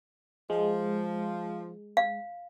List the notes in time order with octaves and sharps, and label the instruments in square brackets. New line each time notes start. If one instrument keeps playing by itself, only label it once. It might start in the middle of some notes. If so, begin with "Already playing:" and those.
[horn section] F3 [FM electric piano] G#3
[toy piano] F5